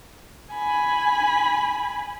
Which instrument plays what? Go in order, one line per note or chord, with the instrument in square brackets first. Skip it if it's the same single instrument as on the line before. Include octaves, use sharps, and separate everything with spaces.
[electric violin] G#5 B5